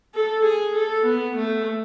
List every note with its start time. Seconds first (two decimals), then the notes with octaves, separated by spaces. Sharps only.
0.15 A4
0.45 G#4
0.76 A4
1.06 B3
1.37 A3